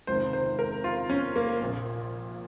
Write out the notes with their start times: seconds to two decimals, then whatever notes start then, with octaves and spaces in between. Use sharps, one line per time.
0.07 C#2 C3 D#3 C5
0.33 C5
0.59 A#4
0.84 F4
1.10 C#4
1.36 A#3
1.61 A#1 A#2